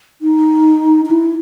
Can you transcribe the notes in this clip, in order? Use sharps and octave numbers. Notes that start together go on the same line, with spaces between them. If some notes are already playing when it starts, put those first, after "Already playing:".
D#4
D#4
E4